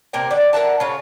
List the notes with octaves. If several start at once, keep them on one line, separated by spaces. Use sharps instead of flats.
C3 A#3 A#4 G5
D3 D5
A#4 E5 F#5 A5
C#3 F4 C#5